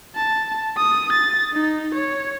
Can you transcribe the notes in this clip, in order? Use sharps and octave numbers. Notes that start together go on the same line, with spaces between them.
A5
D#6
A6
D#4
C#5